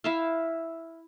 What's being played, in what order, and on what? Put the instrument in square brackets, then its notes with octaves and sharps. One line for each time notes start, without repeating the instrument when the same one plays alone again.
[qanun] E4 E5 F5